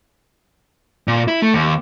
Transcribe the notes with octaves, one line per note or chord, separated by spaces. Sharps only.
A#2
E4
A3
D#2